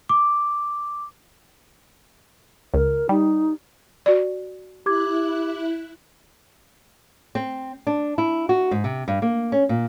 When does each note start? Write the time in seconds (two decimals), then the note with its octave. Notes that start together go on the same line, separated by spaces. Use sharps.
0.09 D6
2.74 C#2 A#4
3.09 G3 D#4
4.06 F#4 D5
4.86 E4 G4 D6 F#6 G#6
7.35 C4
7.87 D4
8.18 E4
8.49 F#4
8.71 G#2
8.84 C3
9.08 G2
9.22 A#3
9.52 C#4
9.69 A#2